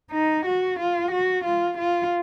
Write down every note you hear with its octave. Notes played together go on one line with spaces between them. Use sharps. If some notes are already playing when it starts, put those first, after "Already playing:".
D#4
F#4
F4
F#4
F4
F4